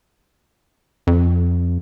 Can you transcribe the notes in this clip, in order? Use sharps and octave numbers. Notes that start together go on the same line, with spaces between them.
F2